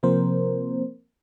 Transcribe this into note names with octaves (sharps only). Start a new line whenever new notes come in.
C3 F3 A#3 C4 A#4 C5